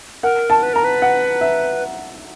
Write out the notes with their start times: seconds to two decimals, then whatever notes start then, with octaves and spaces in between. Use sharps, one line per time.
0.23 A#4 F#5
0.50 A5
0.63 B4
0.73 A#4 A#5
0.84 B4
1.02 F#5
1.41 E5